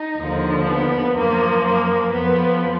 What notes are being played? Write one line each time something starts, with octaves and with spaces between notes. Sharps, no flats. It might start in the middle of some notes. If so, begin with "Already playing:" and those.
Already playing: D#4
D#2 D3 F3
B3
F#2 F3 A#3
A#3
F2 F3 B3